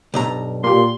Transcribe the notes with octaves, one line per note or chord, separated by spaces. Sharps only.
B1 G2 A#5
A#2 A#3 G4 C6